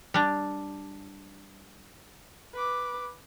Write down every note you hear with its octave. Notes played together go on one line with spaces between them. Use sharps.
G3 D4
B4 D6